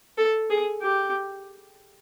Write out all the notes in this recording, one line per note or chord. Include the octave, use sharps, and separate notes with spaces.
A4
G#4
G4